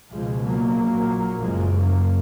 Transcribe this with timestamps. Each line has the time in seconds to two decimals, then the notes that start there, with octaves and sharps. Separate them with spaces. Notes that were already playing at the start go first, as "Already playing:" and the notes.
0.11 C#2 B2 F3 G#3
0.44 F#3 A#3
0.77 A#1 A#2
1.42 F#1 F#2 C#3 F3 G#3
1.74 F#3 A#3